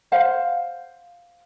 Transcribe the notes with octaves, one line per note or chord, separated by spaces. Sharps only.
C5 F5 F#5